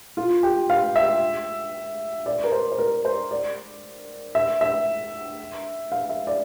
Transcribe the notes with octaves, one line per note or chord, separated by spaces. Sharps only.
F4
G4
F5
E5
D5
A#4
C5
C5
A#4
C5
D5
E5
E5
F5
E5
D5